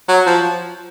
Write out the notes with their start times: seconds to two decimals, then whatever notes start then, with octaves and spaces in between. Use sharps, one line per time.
0.08 F#3
0.26 F3